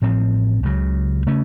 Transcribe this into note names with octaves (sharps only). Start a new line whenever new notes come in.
A1 A2 F3 C4
C#2 C#3 F#3
C#3 A3 C#4